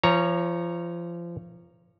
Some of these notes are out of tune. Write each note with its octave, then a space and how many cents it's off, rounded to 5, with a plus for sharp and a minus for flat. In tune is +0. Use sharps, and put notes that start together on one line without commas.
F3 -30 C#5 +0 A#5 +0